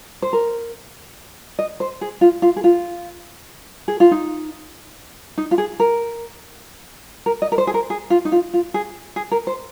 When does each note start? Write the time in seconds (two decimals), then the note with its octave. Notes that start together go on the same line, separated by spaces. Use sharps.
0.22 C5
0.33 A#4
1.59 D#5
1.80 C5
2.01 G#4
2.21 F4
2.42 F4
2.56 G#4
2.64 F4
3.88 G#4
4.00 F4
4.11 D#4
5.38 D#4
5.51 F4
5.58 G#4
5.80 A#4
7.26 A#4
7.42 D#5
7.52 A#4
7.58 C5
7.67 G#4
7.74 A#4
7.90 G#4
8.10 F4
8.25 D#4
8.32 F4
8.53 F4
8.74 G#4
9.16 G#4
9.31 A#4
9.47 C5